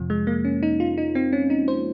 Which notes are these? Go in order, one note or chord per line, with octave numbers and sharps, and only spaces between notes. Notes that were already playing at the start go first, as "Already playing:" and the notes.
Already playing: F2 C3 F3
G#3
A#3
C#4
D#4
F4
D#4
C4
C#4
D#4
C5